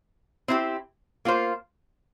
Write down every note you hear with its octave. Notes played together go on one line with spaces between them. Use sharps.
C4 E4 G4
A#3 F4 C5